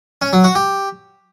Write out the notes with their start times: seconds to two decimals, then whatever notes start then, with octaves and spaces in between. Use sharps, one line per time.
0.22 C#4
0.33 F#3
0.44 F#4
0.55 G4